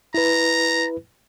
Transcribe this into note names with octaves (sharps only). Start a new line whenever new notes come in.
E4 B4 A#5